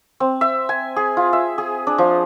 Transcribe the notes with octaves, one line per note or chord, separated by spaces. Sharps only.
C4
E5
G#5
G#4
F4
E5
G#4
D4
F3